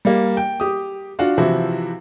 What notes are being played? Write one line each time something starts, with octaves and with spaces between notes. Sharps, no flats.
G3 A#3
G5
G4 D#6
D4 F4 F#4
C3 E3 F3 E4 F#4